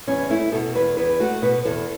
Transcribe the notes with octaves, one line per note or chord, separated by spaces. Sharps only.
E2 C#4
A3 E4
B2 A4
E2 B4
E2 B4
A3 F#4
B2 B4
E2 A4